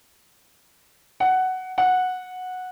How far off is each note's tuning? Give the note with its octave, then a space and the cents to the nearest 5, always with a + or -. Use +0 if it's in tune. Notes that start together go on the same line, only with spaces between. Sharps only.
F#5 +10
F#5 -10